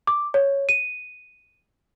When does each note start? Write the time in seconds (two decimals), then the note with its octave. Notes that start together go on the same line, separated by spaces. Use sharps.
0.07 D6
0.34 C#5
0.69 D#7